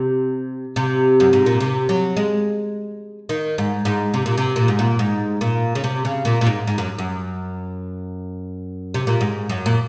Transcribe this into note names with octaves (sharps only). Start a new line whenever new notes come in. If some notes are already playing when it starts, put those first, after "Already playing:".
Already playing: C3
C3
F#2
G#2
A#2
C3
F#3
G#3
D#3
G#2
G#2
C3
A#2
C3
A#2
G#2
A#2
G#2
A#2
C#3
C3
C#3
A#2
A#2
G#2
G#2
F#2
F#2
C3
A#2
G#2
F#2
A#2